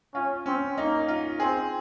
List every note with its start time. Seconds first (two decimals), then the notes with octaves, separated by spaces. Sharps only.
0.15 C#4 F4
0.46 C4 C#4
0.78 A#3 D#4
1.08 F4
1.40 C4 G#4